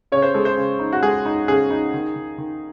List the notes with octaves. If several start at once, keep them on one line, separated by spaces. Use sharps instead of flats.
C#3 C#5
C5
G#3 A4
C5
C#3
D#4
F#4
G#3 G#4
D#4
C#3 G#4
D#4
D#3
D#3
D#3